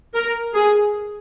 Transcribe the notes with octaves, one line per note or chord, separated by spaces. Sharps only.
A#4
G#4